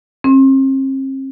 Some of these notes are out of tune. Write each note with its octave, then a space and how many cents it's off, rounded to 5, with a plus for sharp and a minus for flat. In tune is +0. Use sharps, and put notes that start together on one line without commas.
C4 +40